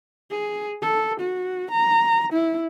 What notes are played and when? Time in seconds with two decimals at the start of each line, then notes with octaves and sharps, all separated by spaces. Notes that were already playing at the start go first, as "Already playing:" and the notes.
0.31 G#4
0.82 A4
1.20 F#4
1.71 A#5
2.33 E4